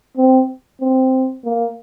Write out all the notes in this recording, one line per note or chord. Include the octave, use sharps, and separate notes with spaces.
C4
C4
A#3